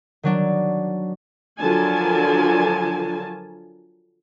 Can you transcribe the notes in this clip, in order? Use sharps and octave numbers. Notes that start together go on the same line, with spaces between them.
D#3 F#3 D4
D3 F3 F#3 A#4 G#5 A5